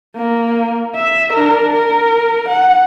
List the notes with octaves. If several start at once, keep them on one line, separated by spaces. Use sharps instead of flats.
A#3
E5
D4 A#4
A#4
F#5